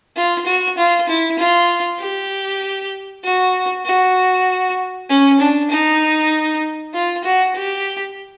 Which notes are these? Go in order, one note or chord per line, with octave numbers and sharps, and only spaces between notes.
F4
F#4
F4
E4
F4
G4
F#4
F#4
C#4
D4
D#4
F4
F#4
G4